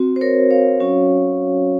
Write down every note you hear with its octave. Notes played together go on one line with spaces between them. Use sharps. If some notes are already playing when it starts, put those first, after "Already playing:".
Already playing: C4 F#4
C5
A#4 C#5
C#5 F5
F#3 C#4 F#4